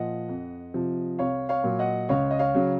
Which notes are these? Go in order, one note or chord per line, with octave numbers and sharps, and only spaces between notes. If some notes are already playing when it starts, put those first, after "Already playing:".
Already playing: A#2 F3 D#5 F#5
F2
C3 F3
C2 C#5 F5
C#5 F5
A#2 F#3
D#5 F#5
C#2 C#5 F5
D#5
C#5 F5
C#3 F#3